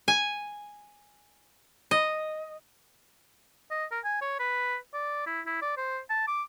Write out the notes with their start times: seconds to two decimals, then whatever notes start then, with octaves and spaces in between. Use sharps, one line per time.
0.08 G#5
1.91 D#5
3.71 D#5
3.91 A#4
4.04 G#5
4.21 C#5
4.39 B4
4.94 D5
5.26 E4
5.46 E4
5.62 D5
5.77 C5
6.10 A5
6.27 D6